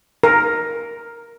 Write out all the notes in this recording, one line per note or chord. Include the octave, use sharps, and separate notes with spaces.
A#4